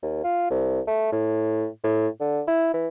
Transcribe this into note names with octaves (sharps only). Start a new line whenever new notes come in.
D#2
F4
C2
A3
A2
A2
D3
E4
E3